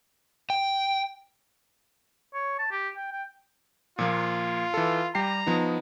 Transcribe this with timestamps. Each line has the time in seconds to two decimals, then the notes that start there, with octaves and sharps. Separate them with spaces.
0.50 G5
2.34 C#5
2.59 A5
2.71 G4
2.96 G5
3.12 G5
3.99 A#2 F3 A#3 F4
4.74 E3 A4
5.15 G3 G4 A#5 C7
5.47 F3 B3 D#4